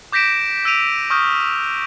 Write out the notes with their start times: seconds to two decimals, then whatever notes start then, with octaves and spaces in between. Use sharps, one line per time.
0.12 D6 G6 A#6 B6 D7 E7
0.65 E6 G6 D7 D#7 F7
1.10 C#6 D#6 F6 G6